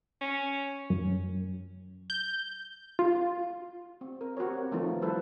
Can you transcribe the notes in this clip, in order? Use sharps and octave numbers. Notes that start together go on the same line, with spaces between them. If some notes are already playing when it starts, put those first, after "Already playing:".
C#4
F#2
G6
F4
C4
A#4
C4 F#4 G4 A#4 C#5
D#3 F3 A3 B3 D#4 F4
F3 G3 E4 A4 B4 C5